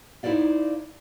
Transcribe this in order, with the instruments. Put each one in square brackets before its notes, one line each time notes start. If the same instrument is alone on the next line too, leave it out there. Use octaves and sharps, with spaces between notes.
[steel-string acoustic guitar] D#4 E4 A4 C5 D5 F5